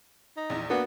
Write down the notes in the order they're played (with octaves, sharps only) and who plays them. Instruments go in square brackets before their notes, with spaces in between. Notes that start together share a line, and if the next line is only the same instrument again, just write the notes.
[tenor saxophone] D#4
[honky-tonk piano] A#1 E2
[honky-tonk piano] A#3 D4 F#4 [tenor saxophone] B3